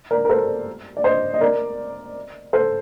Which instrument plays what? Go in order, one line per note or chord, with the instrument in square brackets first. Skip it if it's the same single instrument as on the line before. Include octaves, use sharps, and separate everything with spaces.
[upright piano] A#4 D5
A#4
A4 C5
D5
C5 D#5
D#5
A#4 D5
A4 C5